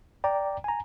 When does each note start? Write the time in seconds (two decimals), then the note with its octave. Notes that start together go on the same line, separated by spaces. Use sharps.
0.24 D5 G5 A#5
0.64 G#5 A#5